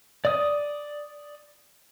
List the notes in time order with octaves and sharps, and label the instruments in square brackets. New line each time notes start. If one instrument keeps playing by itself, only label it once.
[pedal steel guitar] D5 D#6